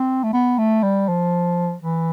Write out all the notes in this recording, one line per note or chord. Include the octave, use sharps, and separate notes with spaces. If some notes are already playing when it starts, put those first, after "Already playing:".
Already playing: C4
A3
B3
A3
G3
F3
E3